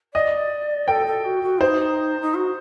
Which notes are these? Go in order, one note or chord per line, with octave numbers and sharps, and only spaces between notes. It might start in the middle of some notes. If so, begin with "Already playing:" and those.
D5 D#5
A4 G5
A4
F#4
F#4
D#4 C5
D#4
F#4